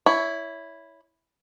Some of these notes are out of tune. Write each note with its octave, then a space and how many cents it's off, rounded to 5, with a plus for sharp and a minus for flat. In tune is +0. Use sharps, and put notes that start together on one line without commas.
E4 +0 C#5 +20